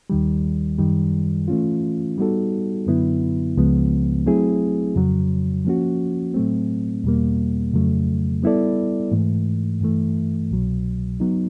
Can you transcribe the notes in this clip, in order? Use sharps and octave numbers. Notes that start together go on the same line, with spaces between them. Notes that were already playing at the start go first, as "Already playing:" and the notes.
D#2 D#3 G3
F#2 D#3 G3
E3 A3 C#4 F4
G3 B3 D#4 F#4 A4
F#2 D3 F#3 B3 E4
C#2 C#3 F3 G#3 B3
F#3 A3 C4 E4 G#4
F2 C#3 F#3
F3 A#3 C#4 F#4
A2 F#3 A3 C4
E2 B2 G3 A#3
F2 C#3 F#3 A3
G3 B3 E4 A4 D5
G#2 E3 A3
G2 E3 A3
C2 B2 F#3
F#3 B3 D#4